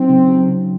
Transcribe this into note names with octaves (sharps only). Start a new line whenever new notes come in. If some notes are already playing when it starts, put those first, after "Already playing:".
Already playing: F#3 C4 D#4
C#3
F#3
C#3